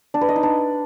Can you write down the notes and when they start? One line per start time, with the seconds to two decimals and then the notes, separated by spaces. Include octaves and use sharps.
0.14 D4
0.21 B4
0.29 D#5
0.36 D#4
0.43 D4